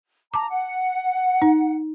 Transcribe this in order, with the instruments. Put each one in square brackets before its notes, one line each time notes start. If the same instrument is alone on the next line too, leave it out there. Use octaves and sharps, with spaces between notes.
[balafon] A5 D6 [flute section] A#5
[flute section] F#5
[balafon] D#4